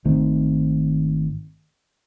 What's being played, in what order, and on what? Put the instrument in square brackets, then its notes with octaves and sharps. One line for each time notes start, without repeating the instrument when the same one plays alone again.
[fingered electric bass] G#1 D#3 A3 C4